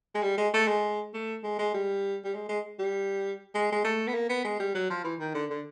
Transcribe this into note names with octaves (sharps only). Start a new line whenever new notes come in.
G#3
G3
G#3
A3
G#3
A3
G#3
G#3
G3
G3
G#3
G#3
G3
G#3
G#3
A3
B3
A#3
B3
G#3
G3
F#3
F3
E3
D#3
D3
D3